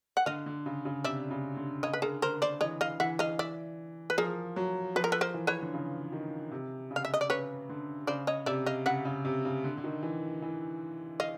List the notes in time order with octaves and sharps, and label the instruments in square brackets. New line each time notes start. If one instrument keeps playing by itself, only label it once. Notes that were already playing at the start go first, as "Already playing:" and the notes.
[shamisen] F#5
[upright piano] D3 [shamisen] D#5 F5
[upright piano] D3
C#3
C#3
[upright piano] C3 [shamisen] D5 E5
[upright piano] C#3
D3
[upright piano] C#3 [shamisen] C#5 D#5
[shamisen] B4
[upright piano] D3 [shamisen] G#4 A#4
[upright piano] D3 [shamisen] A#4 C5
[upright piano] D3 [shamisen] C5 D5
[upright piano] E3 [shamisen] C#5 D#5
[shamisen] D#5 F5
[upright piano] E3 [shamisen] E5 F#5
[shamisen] D#5 F5
D5 E5
B4
[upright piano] F3 [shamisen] G#4 A#4
[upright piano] F#3
[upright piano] F3 [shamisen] B4
[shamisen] A#4
A4 B4
A#4 C5
[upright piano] E3
[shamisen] B4 C#5
[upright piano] D3
C#3
D#3
C3
C#3
[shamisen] F5
E5
D#5
D5
[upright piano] C#3 [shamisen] B4 C#5
[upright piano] D3
[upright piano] C#3 [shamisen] C5 D5
[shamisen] C#5 D#5
[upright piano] C3 [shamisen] D5 E5
[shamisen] D#5 F5
[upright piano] C#3 [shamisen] E5 F#5
[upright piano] C#3
C3
C#3
D3
D3
D#3
E3
E3
[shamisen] D#5 F5